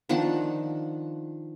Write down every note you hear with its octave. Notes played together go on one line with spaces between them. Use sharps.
D#3 F3 D4 F#5